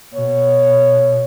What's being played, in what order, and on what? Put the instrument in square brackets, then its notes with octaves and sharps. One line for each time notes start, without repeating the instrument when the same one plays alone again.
[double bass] B2 [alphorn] C#5